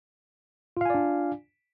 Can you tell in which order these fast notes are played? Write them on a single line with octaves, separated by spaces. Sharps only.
F4 F5 G#5 D5 D4